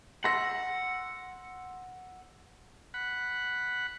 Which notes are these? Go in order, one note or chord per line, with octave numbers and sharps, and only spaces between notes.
F#5 C6 E6 A#6
F#5 B5